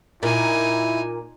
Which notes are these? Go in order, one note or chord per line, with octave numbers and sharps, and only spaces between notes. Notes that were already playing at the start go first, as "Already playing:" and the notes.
A#2 D#4 E4 G#5